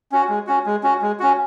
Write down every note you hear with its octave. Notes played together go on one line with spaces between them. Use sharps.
C#4 F#4
G#3
C#4 F#4
G#3
C#4 F#4
G#3
C#4 F#4